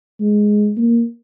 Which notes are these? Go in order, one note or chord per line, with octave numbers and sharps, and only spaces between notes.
G#3
A#3